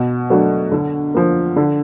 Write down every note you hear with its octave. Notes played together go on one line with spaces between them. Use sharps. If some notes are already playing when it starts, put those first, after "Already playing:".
Already playing: B2
F#3 A3 D4 F#4
D3
F3 A#3
D3